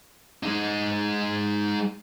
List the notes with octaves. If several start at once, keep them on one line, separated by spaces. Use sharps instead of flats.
G#3 D#4